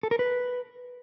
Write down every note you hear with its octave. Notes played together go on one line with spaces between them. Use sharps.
A4
A#4
B4